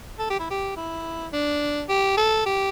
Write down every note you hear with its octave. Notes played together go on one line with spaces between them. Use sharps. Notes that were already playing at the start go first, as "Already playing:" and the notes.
A4
G4
E4
G4
E4
D4
G4
A4
G4